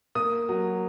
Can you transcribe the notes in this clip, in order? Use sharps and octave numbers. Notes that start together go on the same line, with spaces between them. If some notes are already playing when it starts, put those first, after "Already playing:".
A#3 D#6
F#3